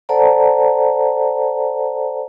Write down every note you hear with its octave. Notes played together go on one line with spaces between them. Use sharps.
A4 C5 D5 F#5 A5 A#5